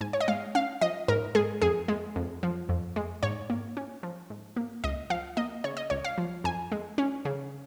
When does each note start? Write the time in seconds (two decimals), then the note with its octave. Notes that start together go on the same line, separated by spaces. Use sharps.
0.01 G#2 G#5
0.13 C#5
0.20 D#5
0.28 G#3 F5
0.55 C#4 F5
0.81 F3 D#5
1.08 G#2 A#4
1.35 G#3 G#4
1.62 F2 G#4
1.88 G#3
2.16 F2
2.43 F3
2.69 F2
2.96 G#3
3.23 G#2 C#5
3.50 A#3
3.77 C#4
4.03 F3
4.30 G#2
4.56 A#3
4.84 C#2 D#5
5.10 F3 F5
5.37 A#3 D#5
5.64 C#3 C#5
5.77 D#5
5.90 C#2 C#5
6.04 F5
6.18 F3
6.44 F2 G#5
6.72 G#3
6.98 C#4
7.25 C#3